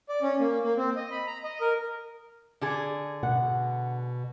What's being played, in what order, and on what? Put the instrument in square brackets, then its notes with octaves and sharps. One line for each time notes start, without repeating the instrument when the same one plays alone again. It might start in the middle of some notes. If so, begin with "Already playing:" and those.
[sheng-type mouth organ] D5
C#4
A#3
A#3
C4
D#5
B5
A#5
D#5
A#4
[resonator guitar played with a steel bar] D3 G#4
[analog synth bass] B2 [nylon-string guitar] F#5